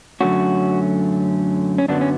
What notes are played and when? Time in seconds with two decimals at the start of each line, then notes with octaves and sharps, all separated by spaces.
0.21 F#2 D3 F#3 A3 C#4 F#4
1.78 C#4
1.88 F#2 D3 F#3 B3 D4
2.01 C#4